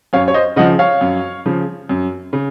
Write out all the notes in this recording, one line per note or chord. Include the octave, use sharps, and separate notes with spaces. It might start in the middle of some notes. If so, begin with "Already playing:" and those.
F#2 C#5 F5
C#5
C5 D#5
C#3 F3 D#5 F#5
C#5 F5
F#2
C#3 F3
F#2
C#3